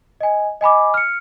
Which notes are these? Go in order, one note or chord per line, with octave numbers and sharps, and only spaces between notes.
D#5 G#5
D#5 G#5 B5 D6
F6 C#7